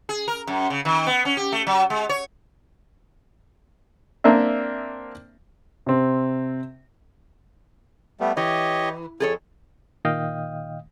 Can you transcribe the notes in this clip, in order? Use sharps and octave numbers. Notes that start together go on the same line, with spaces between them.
G#4
A#4
F#2
C#3
D#3
B3
C#4
G4
A3
F#3
G#3
C#5
A#3 C4 D4 E5
C3 C4
G3 A3 B3
E3 G4 C#5 D#5
F2 G#4 A4 C#5
A#2 D#3 D#5 F5 G5 D#6